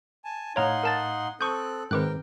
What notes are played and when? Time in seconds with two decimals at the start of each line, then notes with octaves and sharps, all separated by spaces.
0.24 G#5 A5
0.56 A2 D#4 C#5 F5 F#5 A#5 C6 G#6
0.83 A#4 A5 A6
1.41 C4 A4 C#6 D#6 F#6 G6
1.91 G#2 D#3 C4 A#4 B4 G5 D6 F#6